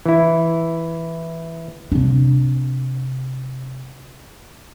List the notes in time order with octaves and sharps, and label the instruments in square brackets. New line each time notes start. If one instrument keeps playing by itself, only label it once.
[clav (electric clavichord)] E3 E4
[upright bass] C3 D4